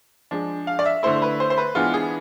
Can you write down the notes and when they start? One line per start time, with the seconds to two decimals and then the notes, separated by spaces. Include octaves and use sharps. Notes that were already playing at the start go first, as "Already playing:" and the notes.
0.31 F3 G#3 D4
0.67 F5
0.79 D5
0.86 E5
1.03 D3 A3 E4 C5
1.22 B4
1.40 C5
1.50 C5
1.58 B4
1.75 E3 G#3 B3 D4 F4
1.94 G#4